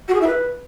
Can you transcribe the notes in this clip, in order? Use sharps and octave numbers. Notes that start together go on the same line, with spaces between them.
F#4
G#4
E4
B4